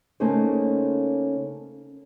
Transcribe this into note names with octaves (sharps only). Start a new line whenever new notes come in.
C#3 A3 A#3 C#4 D#4 C5